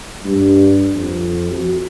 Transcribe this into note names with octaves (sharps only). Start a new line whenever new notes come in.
G2
F2
F#4